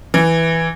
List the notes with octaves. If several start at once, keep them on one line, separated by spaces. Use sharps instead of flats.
E3